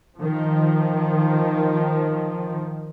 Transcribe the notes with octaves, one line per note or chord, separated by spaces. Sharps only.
D#3 F3